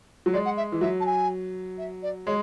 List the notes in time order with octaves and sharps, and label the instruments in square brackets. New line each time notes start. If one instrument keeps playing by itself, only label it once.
[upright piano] F#3
[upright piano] G#3 [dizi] D5
[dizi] F#5
E5
[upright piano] E3
[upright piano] F#3 [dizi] E5
[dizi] A5
G#5
E5
D5
[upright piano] G#3 [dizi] C#5